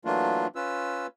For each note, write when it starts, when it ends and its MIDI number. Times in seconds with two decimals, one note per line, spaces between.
0.05 0.47 52
0.05 0.47 54
0.05 0.47 57
0.05 0.47 58
0.05 0.47 62
0.05 0.47 65
0.56 1.07 61
0.56 1.07 65
0.56 1.07 71
0.56 1.07 88